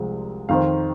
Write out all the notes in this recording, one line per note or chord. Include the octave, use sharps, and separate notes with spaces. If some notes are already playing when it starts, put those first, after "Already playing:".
Already playing: C2 C3 F3 G#3 C4
F2 D#3 C4 F5